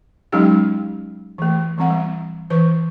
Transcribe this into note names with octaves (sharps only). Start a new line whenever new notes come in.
F#3 G#3 C#4 D#4 G4 G5
E3 A3
E3 G3 C4 F#5
G3
E3 B4 C#6